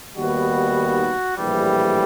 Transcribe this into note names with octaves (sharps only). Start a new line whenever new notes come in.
D#2 D#3 G3 B3 F#4
A#1 A2 E3 G3